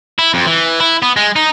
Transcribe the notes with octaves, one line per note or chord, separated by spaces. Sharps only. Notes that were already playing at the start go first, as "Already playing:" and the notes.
E4
F2
E3
E4
B3
G#3
D#4